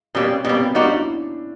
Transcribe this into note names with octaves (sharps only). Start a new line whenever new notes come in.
B2 G3 A#3 C#4
C4
B2 G3 A#3 B3
C4
G3 A#3 C#4 D#4 F#4
D4
E4